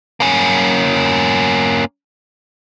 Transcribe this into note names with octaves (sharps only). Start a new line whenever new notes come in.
A#3 C#4